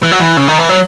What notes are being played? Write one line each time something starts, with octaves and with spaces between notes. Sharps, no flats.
E3
F#3
E3
C#3
D#3
E3
F#3